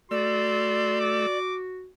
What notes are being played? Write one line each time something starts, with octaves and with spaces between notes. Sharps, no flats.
A3 F#4 D5 C6 E6
D6